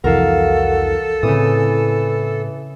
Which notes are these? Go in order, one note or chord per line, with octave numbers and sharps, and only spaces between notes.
C2 F2 E3 F#4 A4 A#4 F5
A2 C#3 E3 C4 D#6